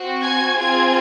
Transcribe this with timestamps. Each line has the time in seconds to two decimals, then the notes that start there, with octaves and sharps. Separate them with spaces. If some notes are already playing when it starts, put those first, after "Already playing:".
Already playing: C4 F#4
0.21 G#5 G#6
0.58 C4 F4 G#4 G#5 G#6